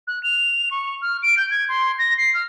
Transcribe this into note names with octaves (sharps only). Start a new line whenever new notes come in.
F#6
F7
C#6
F6
D7
G6
G#6
C6
A#6
C7
F6